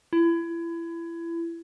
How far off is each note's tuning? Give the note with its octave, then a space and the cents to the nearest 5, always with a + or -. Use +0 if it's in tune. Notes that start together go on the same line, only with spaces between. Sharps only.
E4 +30